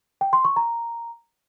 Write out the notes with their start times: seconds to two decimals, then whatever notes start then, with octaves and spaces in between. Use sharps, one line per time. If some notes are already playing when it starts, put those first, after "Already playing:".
0.21 G5
0.33 C6
0.45 C#6
0.56 A#5